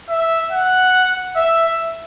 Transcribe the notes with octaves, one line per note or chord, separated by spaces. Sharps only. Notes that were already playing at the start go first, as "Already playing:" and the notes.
E5
F#5
E5